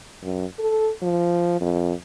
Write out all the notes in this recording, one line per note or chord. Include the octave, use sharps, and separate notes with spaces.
F#2
A4
F3
F2